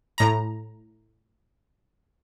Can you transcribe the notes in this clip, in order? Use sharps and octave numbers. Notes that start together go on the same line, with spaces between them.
A2 A#5